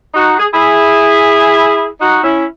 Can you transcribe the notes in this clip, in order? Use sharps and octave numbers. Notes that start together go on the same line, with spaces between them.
D#4 F#4
G#4
E4 G#4
D#4 F#4
C#4 E4